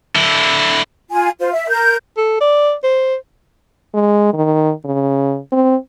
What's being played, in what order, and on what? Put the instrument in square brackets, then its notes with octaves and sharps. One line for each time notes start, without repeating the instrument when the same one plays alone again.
[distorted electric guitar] D3 E4
[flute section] F4 G#5
F4 C5
E5
A#4 G6
[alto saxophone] A4
D5
C5
[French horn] G#3
D#3
C#3
C4